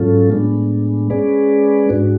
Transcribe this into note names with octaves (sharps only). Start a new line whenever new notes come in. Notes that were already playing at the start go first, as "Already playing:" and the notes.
Already playing: G#2 F#3 C#4 F4 A4
A2 G#3 B3 D4
G#3 C#4 G#4 B4 D5
G#2 G#3 D4 F#4